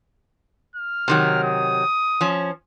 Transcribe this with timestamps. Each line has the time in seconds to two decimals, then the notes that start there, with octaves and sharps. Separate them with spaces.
0.76 F6
1.08 C3 D#3 F#3
1.43 D#6
2.21 F3 C#4